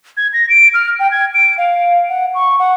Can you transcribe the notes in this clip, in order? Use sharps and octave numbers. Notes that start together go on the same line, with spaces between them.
G#6
A#6
D7
F6
G5
G#6
D7
F5
F#5
C#6
F#5